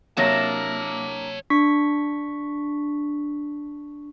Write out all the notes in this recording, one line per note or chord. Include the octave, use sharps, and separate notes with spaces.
C3 F#3 A#3 D4 A#4 C#5 E5 A5
D4 C#6 B6